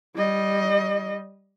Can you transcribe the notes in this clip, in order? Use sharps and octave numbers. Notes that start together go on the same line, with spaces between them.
G3 D#5